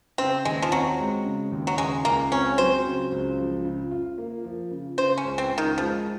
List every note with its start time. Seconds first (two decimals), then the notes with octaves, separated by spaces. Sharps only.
0.18 C#3 C4
0.45 D#2 G#3
0.62 F3
0.72 F#3 C4
0.99 G#3
1.24 C#3
1.52 D#2
1.67 F#3
1.78 C#3 G#3
2.05 C#2 A#3
2.31 C4 C#4
2.58 F#3 C5
2.85 C#3
3.12 C#2
3.38 F3
3.65 C#3
3.91 F4
4.18 A#3
4.44 F3
4.71 C#3
4.98 C#3 C5
5.18 C#4
5.25 C#2
5.38 C4
5.52 C#2
5.58 D#3
5.78 F3 G#3